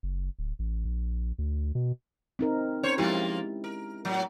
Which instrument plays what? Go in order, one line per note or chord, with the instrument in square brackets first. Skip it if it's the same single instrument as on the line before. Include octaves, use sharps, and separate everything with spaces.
[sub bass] F#1
D1
A1
A#1
D2
B2
[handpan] C4 D#4 A#4
[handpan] C#4 [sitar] C5 C#5
[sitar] F3 A#3 F4 [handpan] G#3 E4 G4
[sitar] A#4
A2 F#3